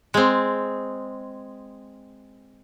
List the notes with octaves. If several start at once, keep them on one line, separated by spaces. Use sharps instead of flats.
G#3 C4